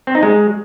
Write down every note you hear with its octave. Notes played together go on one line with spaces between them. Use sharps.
C4
D#4
G#3